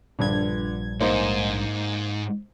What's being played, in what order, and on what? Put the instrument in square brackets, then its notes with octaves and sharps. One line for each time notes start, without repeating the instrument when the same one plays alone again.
[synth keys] A#1 G2 G#6 [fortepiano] D3
[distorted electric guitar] G#2 [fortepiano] A#3 D#4 C5